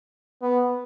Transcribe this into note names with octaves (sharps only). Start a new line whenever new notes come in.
B3